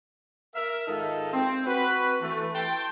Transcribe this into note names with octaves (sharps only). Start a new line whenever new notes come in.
A#4 E5
G#2 D#3 D#4 F4 A4 D#5
C4
F#4 B4
E3 A3
G5 A5 C6